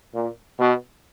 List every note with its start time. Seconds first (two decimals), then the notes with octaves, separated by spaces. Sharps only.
0.14 A#2
0.59 B2